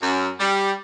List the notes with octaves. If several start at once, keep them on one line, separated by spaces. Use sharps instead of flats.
F#2
G3